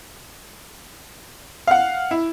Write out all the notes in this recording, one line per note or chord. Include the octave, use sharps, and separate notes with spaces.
F5 F#5
E4